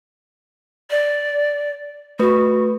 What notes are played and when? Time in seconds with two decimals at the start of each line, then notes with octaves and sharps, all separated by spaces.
0.91 D5
2.19 A3 F#4 B4